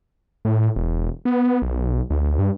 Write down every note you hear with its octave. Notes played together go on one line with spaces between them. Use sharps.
A2
E1
B3
B1
D2
G2